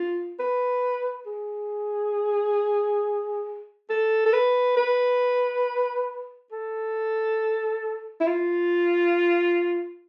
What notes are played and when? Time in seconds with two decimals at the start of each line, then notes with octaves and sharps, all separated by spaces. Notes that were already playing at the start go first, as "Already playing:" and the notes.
Already playing: F4
0.39 B4
1.26 G#4
3.90 A4
4.26 A4
4.33 B4
4.77 B4
6.52 A4
8.20 E4
8.27 F4